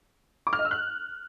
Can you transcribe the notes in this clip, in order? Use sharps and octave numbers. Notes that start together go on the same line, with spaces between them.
D6
F6
D#5
E6
F#6